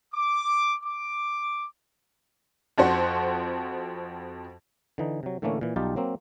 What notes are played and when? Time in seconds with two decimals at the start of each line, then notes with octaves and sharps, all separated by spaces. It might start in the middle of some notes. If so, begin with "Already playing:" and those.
0.14 D6
0.84 D6
2.78 F2 F3 F#4 C5
4.98 D3 E3 D#4
5.23 C3 F#3
5.42 A2 D3 E3 A3 A#3 C#4
5.61 A#2 E3
5.76 B1 G3 D#4 F4 G4 A5
5.96 F#3 A#3 C4